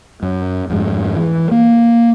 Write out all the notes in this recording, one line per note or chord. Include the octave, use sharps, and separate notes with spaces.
F#2
F2 G#2
E3
A#3